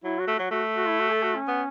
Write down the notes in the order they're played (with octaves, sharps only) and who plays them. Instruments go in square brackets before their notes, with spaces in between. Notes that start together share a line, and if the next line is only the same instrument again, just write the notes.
[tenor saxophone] F#3 [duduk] E4
[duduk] F#4
[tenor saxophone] A3
[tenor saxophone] F#3 [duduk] F#4
[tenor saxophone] A3 [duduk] F#4
[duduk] F#4
E4
F#4
A4
F#4
C#4
[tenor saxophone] B3